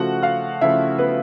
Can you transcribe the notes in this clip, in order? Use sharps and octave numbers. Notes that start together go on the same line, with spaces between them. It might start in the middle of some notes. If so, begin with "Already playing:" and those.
Already playing: C#3 F3 A3 F#4 F#5
F4 F5
C#3 F3 A3 E4 E5
B3 B4